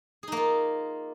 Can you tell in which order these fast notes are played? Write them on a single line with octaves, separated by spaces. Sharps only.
G#4 D#4 A#3 F4